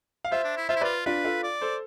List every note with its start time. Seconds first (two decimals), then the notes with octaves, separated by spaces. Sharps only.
0.25 F5
0.31 F4 C5 E5
0.44 D4
0.57 E4
0.69 F4 C5 E5
0.76 E4
0.81 F4 B4 D5
1.06 D4 F4 B4
1.25 F4 A4
1.43 D5
1.61 A4 C5